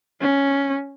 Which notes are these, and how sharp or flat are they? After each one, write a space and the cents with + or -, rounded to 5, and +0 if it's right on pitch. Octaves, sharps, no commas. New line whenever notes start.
C#4 +5